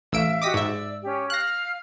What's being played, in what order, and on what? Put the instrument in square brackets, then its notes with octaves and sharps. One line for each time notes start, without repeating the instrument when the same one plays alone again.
[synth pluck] A1 E6 D7 [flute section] E5 F5
[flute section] F#4 G4 D#5 [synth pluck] D6 D#6 B6
[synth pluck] G#2 E5 [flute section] D5 E6
[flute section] C#4 G4
[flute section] F5 F6 [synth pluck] F#6 A#6